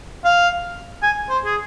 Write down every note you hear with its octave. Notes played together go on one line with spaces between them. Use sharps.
F5
G#5
C5
G#4